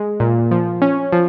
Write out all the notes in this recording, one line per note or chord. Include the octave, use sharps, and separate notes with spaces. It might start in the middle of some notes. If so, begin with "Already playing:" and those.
Already playing: G#3
A#2
F3
C#4
F3